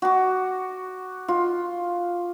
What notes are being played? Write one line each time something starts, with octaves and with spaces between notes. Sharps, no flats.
F#4 D6
F4